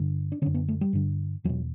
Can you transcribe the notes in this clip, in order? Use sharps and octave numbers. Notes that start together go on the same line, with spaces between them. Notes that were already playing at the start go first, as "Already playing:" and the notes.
Already playing: G2 D3
D4
F#2 D3 C#4
B3
A3
G3
G2 D3
E2 B2 F#3